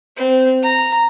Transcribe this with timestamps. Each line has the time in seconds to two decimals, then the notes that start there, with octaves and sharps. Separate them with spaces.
0.17 C4
0.63 A#5